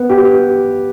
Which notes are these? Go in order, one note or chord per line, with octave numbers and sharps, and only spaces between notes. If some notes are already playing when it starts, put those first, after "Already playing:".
Already playing: B3
G4